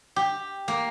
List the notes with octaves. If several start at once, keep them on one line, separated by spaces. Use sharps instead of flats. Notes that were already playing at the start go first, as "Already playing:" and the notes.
G4
A#3